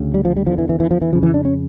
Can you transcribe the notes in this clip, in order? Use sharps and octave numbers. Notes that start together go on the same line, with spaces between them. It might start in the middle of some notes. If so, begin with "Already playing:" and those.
Already playing: D2 C#3
G3
F3
G3
E2 D3 F3
E3
E3
E3
F3
E3
F2 C#3 F3
E3
D4
C#4